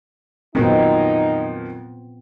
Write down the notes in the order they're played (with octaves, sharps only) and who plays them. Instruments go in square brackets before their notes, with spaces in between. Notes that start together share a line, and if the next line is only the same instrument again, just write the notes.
[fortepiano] F2 D#3 F#3 [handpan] A#2 B3 C4 [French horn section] D#4